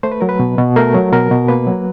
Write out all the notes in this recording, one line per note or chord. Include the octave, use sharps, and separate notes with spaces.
A3 C5
B4
F#3 A#4
B4
B2
B2
A3 A#4
F#3
B2 A#4
B2
A#3 B4
F#3